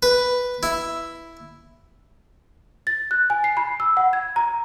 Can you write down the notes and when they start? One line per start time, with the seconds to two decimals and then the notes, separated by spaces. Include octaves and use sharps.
0.03 B4
0.63 E4
2.87 A6
3.11 F#6
3.30 G#5
3.44 C7
3.57 B5
3.80 E6
3.97 F#5
4.13 G#6
4.36 A#5